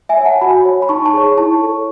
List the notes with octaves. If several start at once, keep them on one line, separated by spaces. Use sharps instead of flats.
E5 G#5
C#5
F#5 A5
F#4 G#5 B5
C#5
B5
D#4 A5 C#6
A5 C#6
G#4 C#5
E4 A5 C#6
A4 C#5